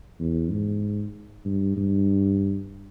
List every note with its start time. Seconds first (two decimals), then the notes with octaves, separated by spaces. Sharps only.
0.20 E2
0.51 G#2
1.45 G2
1.77 G2